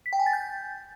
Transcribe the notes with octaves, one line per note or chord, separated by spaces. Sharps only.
B6
G5
G#5
A6
G6